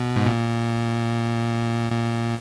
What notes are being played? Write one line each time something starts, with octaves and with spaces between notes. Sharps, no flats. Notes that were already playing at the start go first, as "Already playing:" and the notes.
Already playing: B2
G#2
A#2
A#2